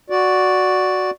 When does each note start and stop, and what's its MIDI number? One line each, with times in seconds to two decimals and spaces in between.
0.10 1.11 66
0.10 1.11 74